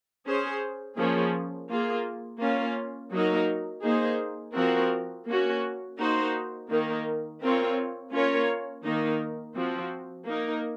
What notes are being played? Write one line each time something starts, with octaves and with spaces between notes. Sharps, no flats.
C#4 G#4 C5
F3 A#3 C#4 G#4
A#3 F4 G#4
A#3 C#4 F4
F#3 A#3 D#4 F#4 A#4
A#3 D#4 G#4 C5
F3 C4 F#4 A#4
A#3 C#4 F#4
A#3 D#4 F#4 C5
D#3 A#3 D#4 A#4
C4 F4 A#4 C#5
A#3 C#4 F4 A#4 C#5
D#3 A#3 D#4 A#4
F3 C4 F#4
A#3 D#4 A#4